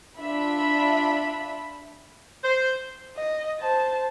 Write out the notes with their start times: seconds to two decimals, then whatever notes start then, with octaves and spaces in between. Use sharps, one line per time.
0.19 D4 F4 E5 B5
2.43 C5
3.17 D#5
3.60 C5 A5